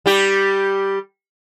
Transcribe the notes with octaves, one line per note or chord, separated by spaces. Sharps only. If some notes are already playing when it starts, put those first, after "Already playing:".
G3 G4